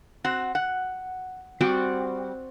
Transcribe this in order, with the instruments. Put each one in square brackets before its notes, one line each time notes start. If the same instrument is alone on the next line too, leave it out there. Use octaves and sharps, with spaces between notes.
[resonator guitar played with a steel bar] C4 F#4 F#5
F#5
[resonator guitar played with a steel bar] G3 [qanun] C4 F#4 D5